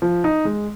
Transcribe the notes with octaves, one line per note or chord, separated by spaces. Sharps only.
F3
D#4
G#3